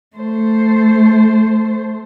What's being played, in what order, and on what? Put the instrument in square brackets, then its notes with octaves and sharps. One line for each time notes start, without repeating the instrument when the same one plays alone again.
[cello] A3 C5